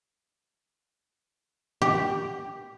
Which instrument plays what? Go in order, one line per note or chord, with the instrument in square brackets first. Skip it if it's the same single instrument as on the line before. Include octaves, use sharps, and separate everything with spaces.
[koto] G4